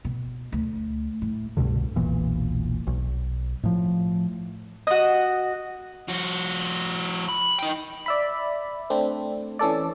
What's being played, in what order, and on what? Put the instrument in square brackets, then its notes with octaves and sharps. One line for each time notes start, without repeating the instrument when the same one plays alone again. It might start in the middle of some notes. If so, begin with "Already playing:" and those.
[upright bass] B2
D2
A2
[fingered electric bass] C2 G2 B2 D3
E1 B1 A#2 E3
B1
A2 F3
[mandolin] F#4 D#5
[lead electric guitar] F3 F#4
B5
D#4 G5
[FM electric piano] D5 E5 B5
A3 C4 D4
E3 C#4 A4 D5